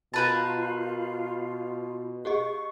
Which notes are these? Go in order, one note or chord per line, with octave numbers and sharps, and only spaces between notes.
B2 F4 A#4 B4 A5 B5 G6
G4 G#4 D#5 C#6